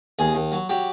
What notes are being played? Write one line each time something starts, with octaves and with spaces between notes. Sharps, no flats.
D#2 G#4
D#2
F#3
F#3 G4